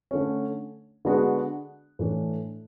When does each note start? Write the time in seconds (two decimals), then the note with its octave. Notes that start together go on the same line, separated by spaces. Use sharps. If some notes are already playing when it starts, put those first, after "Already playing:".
0.11 D3 A3 C#4
1.05 D3 G#3 B3 D4 F#4
1.99 A2 E3 A3 D4